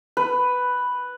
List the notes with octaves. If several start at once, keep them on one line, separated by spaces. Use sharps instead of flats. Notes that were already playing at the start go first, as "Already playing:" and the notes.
B4